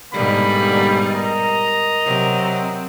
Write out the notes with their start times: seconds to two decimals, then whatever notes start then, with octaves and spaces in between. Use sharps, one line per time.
0.13 G#2 B2 D3 G3 A#3 B5
1.10 A#4 D#5 A#5
2.05 C3 F#3 C4